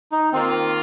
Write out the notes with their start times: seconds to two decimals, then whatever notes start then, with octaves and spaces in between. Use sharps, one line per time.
0.12 D#4
0.32 D#3 A#3 C4 F4